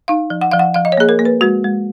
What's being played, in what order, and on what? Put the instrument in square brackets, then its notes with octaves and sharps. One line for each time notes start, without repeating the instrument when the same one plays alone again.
[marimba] D#4 F5
F3
F#5
F3 F5
F#5
F3 F5
D#5
C#5
A#3 G#4
A#4
A#3
B4
G#3 F#4
G#3